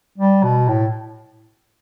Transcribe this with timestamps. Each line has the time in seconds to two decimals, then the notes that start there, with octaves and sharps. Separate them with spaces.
0.18 G3
0.43 B2
0.68 A2